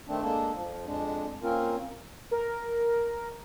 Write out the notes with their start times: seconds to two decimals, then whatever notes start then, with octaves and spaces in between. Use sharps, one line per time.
0.08 D#3 A3 C4 D4
0.22 G#3 A#3 D4 A4
0.54 F2 F3
0.86 F2 G#3 D4
1.43 A#3 C4 C#4 F4 A#4
2.31 A#4